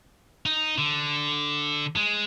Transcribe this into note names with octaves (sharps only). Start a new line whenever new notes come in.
D#4
D3
G#3